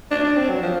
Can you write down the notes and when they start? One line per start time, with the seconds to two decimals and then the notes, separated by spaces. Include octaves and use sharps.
0.11 D4
0.24 D4
0.36 C4
0.49 F#3
0.62 F3